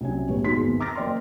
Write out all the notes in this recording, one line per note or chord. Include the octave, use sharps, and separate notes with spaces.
C2 C3 F#3 C#4 G#5
G1 A2 G3 C#5
B2 G#3 D#4 F#4 C6 B6
G#1 E2
A#5 D6 F6 A6 A#6
F#1 D5 D#5 G5 C6